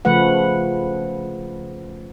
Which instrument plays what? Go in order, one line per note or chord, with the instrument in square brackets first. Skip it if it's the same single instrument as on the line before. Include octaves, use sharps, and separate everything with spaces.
[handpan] C#3 F3 A3 B4 F#5